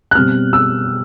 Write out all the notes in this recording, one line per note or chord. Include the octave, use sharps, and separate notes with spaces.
F#6
B2 G3 C4 F6
E6